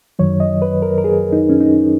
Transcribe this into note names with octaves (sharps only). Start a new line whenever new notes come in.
F#2 D#3 F#3 C#5
D#5
B4
A#4
A#4
G#4
D#4
C#4
D#4